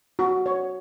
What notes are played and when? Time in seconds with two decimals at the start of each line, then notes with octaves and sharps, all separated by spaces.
0.19 F#4
0.46 C#5